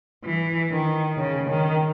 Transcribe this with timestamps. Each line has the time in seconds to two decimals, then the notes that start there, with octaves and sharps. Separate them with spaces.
0.25 E3
0.72 D#3
1.17 C#3
1.49 D#3